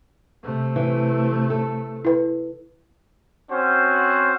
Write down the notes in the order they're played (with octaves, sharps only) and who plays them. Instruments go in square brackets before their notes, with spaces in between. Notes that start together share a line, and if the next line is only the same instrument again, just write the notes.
[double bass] C3 A3
[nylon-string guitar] E3
A4
[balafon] E4 B4
[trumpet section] C4 C#4 F#4 C5